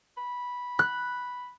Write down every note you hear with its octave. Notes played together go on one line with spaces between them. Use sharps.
B5
F#6